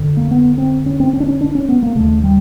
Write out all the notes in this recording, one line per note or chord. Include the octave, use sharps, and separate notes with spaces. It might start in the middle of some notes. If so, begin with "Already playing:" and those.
Already playing: F2 D3
A#3
B3
C4
C#4
C4
C#4
D4
C#4
D4
C#4
B3
A#3
D#2 C#3 A3
G3